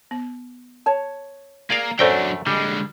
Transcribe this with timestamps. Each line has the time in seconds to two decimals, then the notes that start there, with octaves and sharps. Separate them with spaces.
0.11 B3
0.86 C#5 A5
1.70 A#3 G#4 A#4 D5 F5
1.99 F#2 F#3 A3 D4 A4 C5 D5 G5
2.47 D3 G3 G#3